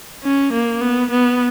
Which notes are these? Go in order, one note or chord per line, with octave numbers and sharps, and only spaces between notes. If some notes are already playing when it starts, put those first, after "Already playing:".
C#4
A#3
B3
B3